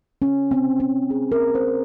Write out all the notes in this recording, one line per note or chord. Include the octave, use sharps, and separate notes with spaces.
C#4
C4
C#4
G#4
A#4
C5